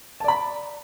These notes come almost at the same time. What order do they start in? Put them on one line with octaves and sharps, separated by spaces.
A5 D5 B5